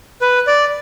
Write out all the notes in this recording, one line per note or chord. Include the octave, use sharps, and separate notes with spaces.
B4
D5